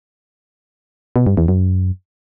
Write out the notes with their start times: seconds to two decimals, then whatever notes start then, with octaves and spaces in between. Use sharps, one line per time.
1.16 B2
1.27 G2
1.37 E2
1.48 F#2